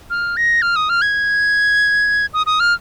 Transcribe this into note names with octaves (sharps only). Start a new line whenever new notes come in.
F6
A#6
F6
D#6
F6
G#6
D#6
D#6
F6